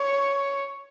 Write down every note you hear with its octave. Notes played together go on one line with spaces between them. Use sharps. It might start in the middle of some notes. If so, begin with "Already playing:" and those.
Already playing: C#5